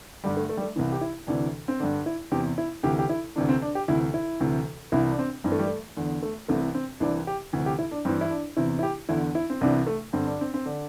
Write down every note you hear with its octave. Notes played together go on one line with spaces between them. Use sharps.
G2 D3 G3
A3
A3
G3
A3
C2 C3 E3
G4
E4
D2 C3 E3 D4
C4
G2 D3 D4
E4
E2 C3 E3 G4
E4
D2 C3 E3 G4
G4
E4
D2 C3 E3 D4
C4
D4
G4
D2 C3 E3 E4
E4
D2 C3 E3
C2 C3 E3 E4
D4
C4
G2 E3 C4
A3
G3
A3
E2 D3
A3
C2 C3 E3 A3
C4
C2 C3 E3 D4
G4
D2 C3 E3
G4
E4
D4
G2 E3 C4
E4
D4
E2 C3 E3 E4
E4
G4
E2 D3 E4
E4
C4
C2 C3 E3 D4
A3
G2 D3 C4
D4
C4
C4
D3 D4